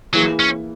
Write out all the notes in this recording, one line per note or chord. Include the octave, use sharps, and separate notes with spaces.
E3 F#3 A#3 E4 G#4
C#4